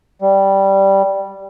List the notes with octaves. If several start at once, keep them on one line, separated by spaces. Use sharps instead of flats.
G3